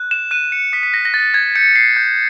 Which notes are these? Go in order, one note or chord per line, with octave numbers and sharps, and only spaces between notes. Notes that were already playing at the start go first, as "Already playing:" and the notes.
Already playing: F#6
E7
F#6 D#7
C#7
D#6 B6
B6
A#6
A#6
D#6 A6
G#6
G6 C#7
C7
G6